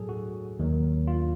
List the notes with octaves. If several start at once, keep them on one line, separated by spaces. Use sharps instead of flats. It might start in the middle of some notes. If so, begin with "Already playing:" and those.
Already playing: A2 F#3 G#4 A4
F#4
D#2 D#3 F#3
F4